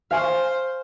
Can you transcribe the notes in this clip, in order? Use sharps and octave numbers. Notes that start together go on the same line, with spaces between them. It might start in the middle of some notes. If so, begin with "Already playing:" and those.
C5 F5 G#5 C#6